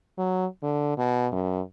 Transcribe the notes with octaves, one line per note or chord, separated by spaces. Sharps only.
F#3
D3
B2
F#2